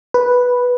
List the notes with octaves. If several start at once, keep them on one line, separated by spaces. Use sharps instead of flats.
B4